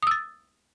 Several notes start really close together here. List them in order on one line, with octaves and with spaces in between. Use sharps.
D#6 E6 A6